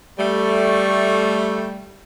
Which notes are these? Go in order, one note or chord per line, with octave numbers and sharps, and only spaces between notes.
G3 A3